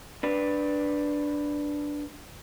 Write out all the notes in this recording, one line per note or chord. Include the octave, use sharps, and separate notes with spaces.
D4 B4